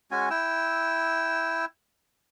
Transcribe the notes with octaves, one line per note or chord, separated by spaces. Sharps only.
G#3 C#4 F#4 G#5
E4 G5 E6